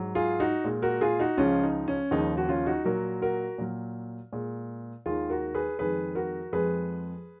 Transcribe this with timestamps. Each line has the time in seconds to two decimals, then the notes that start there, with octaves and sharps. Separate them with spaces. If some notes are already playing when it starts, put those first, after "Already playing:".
Already playing: G#2 F#3
0.15 F4 G#4
0.40 D#4 F#4
0.64 A#2 G#3
0.82 F#4 A#4
1.01 F4 G#4
1.19 D#4 F#4
1.37 C#2 C#3 F3 G#3 C#4 F4
1.63 D#4
1.88 C#4
2.11 D#2 C#3 F3 G#3 D#4
2.37 F#4
2.49 C#4 F4
2.66 D#4 F#4
2.84 A#2 F#3 F#4 A#4
3.22 F#4 A#4
3.58 A#2 F#3
4.33 A#2 G#3
5.06 D#2 D#3 G#3 F4 G#4
5.30 F#4 A#4
5.54 G#4 B4
5.79 F2 D#3 G#3 G#4 B4
6.15 F#4 A#4
6.53 F2 F3 G#3 G#4 B4